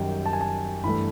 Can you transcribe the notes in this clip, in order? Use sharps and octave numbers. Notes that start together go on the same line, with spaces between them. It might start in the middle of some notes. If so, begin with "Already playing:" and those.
Already playing: F#2 D#3 G3 G5
A5
G#5
A5
G2 E3 A3 B5